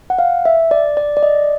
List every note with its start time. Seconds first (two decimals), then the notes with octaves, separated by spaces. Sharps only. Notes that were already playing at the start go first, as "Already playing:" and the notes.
0.10 F#5
0.19 F5
0.45 E5
0.71 D5
0.97 D5
1.17 D5
1.23 D#5